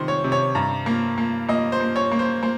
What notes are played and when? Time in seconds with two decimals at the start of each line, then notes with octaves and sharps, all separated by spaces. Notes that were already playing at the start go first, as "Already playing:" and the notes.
Already playing: C3 D#3 C5
0.08 C#5
0.24 C3
0.32 C#5
0.55 G2 A#5
0.86 A#3
1.18 A#3
1.48 A#3 D#5
1.72 C5
1.80 A#3
1.96 C#5
2.11 A#3
2.19 C5
2.43 A#3 C5